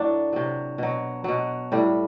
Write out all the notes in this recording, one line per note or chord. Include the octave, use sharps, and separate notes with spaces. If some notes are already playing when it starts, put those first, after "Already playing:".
Already playing: A2 F#3 D4
C3 F#3
B2 F#3
B2 F#3
A2 G3